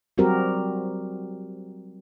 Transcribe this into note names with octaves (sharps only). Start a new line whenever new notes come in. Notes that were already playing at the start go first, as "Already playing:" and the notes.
F#3 G3 C4 F#4 G4 A#4